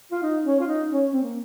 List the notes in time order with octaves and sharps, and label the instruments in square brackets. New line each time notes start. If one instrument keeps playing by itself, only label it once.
[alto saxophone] F4
D#4
C#4
F4
D#4
C#4
C4
A#3